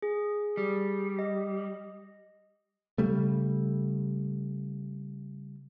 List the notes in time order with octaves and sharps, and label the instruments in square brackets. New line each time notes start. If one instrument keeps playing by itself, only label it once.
[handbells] G#4
[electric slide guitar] G3
[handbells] D#5
[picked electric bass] C#3 G3 A3